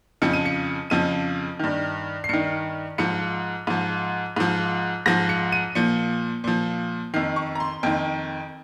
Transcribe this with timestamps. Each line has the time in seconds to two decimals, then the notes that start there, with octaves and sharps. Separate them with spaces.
0.22 F2 C#3 F3 C#7
0.33 D#7
0.45 C#7
0.90 F2 C#3 F3 D#7
1.59 G2 D#3
2.24 C7
2.29 G2 D#3 C#7
2.98 G#2 F3 C#7
3.67 G#2 F3
4.36 G#2 F3
5.06 G#2 F3 A#6
5.29 C#7
5.52 D#7
5.75 A#2 F3 C#7
6.44 A#2 F3
7.14 F2 D#3 C7
7.36 C#6
7.55 A#5
7.60 C6
7.83 F2 D#3 G5